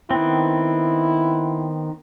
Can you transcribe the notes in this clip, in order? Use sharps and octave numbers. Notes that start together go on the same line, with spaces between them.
D#3 B3 C4 E4